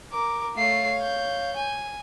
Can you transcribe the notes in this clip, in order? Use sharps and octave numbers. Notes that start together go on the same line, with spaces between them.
A#4 D6
A3 C#5 F5 C7
G6
G#5